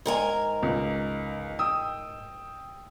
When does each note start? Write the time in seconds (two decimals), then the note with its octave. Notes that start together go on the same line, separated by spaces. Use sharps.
0.05 G#2 A#4 G#5
0.63 C#2
1.59 G5 D#6 E6